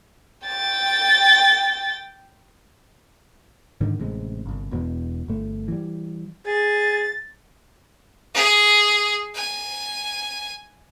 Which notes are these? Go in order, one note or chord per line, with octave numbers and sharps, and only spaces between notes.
G5 A6
G#2 D3 D#3
A1 C3 G#3
G1 C2
E1 E2 B2
G1 A3
E3 G3
G#4 A6
G#4
G#5